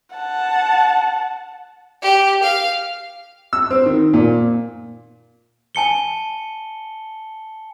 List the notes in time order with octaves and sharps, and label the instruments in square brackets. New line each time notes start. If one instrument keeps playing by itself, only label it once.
[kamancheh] F#5 A5
[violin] G4
F5
[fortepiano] E6
C4
D#3
A#2
[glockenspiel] G#5 A5 C#7 G7